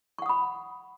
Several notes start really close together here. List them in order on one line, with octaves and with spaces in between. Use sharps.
C#6 F#5 D#6 B5